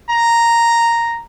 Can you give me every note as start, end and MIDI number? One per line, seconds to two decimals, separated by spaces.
0.10 1.23 82